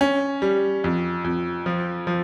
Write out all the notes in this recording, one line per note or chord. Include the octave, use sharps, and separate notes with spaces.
C#4
G3
F2
F2
F3
F3